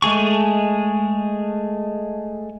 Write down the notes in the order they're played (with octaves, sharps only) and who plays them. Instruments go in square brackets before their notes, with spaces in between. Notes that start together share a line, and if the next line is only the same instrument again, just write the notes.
[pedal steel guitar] G#3 A3 G#4 C#6